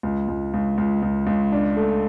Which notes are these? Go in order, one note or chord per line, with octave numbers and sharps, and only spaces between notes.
C#2
C#2
C#2
C#2
C#2
C#2
D4
A3